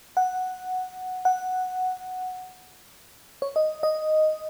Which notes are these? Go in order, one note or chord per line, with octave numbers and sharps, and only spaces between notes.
F#5
F#5
C#5
D#5
D#5